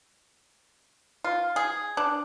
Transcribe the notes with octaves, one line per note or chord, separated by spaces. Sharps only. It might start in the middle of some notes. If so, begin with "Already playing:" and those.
F4
G#4
D4